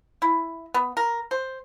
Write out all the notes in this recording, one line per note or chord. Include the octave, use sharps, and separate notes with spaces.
E4
B3
A#4
C5